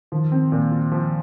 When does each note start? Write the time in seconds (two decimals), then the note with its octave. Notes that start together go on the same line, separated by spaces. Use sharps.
0.12 D#3 F3
0.32 C4
0.52 A#2
0.72 F4
0.92 F3